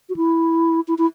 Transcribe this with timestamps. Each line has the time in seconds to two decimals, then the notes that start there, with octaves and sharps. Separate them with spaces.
0.09 F#4
0.16 E4
0.88 E4
0.98 E4